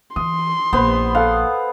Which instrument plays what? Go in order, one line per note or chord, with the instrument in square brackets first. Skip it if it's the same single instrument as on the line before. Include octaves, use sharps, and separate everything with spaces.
[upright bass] E3 [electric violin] C6 [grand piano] D#6
[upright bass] A#1 [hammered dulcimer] B3 C5
[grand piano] A4 F5 [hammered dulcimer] F#5